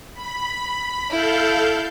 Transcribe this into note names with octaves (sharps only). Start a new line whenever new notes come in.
B5
E4 A4 F5 G6